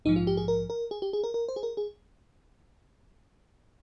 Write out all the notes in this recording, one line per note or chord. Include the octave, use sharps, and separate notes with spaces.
A#1 G#2 F3 D#4
F4
G4
G#4
A#4
A#4
G#4
G4
G#4
A#4
A#4
C5
G#4
A#4
G#4